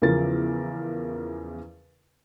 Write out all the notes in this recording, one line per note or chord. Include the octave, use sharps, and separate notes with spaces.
E2 C#3 F3 A#4 A6